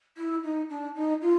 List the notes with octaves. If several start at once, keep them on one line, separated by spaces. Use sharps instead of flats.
E4
D#4
D4
D#4
F4